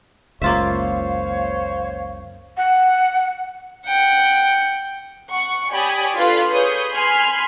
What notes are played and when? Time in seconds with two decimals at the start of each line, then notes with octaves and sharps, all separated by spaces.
0.42 F#1 C#2 A#3 F4 C5 C#5 E5 F5
2.57 F#5
3.86 F#5 G5
5.29 F#5 C#6
5.70 G4 C#5 D5 G#5 B5 D#6
6.15 D4 F4 A4 B4 F5
6.51 G#4 B4 C#5 D#6 G6
6.93 G#5 B5 C6 F6 B6 C7